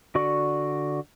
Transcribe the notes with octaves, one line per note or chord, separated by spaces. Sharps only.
D3 F#4 D5 C#6